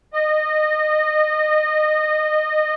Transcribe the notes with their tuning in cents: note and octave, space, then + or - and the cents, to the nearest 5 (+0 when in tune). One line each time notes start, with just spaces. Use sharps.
D#5 -20